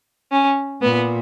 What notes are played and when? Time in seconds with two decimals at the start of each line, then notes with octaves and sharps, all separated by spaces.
0.32 C#4
0.82 A#2 B3